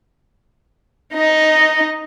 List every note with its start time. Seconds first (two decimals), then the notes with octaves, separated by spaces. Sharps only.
1.13 D#4 D#5